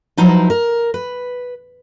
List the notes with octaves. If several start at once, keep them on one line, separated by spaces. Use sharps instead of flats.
F3 F#3 D#4 E4 B4 C5
A#4
B4